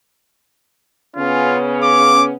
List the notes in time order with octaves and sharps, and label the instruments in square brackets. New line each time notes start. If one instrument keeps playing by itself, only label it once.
[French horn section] C#3 B3 C#4 [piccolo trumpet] F4
[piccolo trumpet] D6